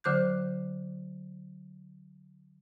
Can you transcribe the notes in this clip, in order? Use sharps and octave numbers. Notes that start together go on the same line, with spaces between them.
D3 F#3 C5 D6 F#6 G6